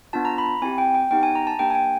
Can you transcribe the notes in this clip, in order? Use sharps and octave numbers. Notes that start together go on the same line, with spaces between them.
B3 D4 F4 A5
A#5
B5
C4 E4 G4 G#5
G5
G5
B3 D#4 G4 G5
G#5
A#5
A5
A#3 D4 G4 G5
G#5
G5